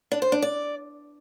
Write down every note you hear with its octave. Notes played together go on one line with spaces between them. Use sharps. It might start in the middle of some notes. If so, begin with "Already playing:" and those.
D4
C5
D4
D5